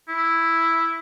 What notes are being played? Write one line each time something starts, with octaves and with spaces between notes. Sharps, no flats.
E4